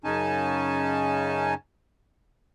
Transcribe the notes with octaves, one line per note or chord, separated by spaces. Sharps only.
F#2 C#3 C#4 D#4 G#5 A5